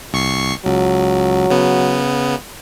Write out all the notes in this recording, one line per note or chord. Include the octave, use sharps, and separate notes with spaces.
C2 C#6 C7
C#2 F#3
C#3 B3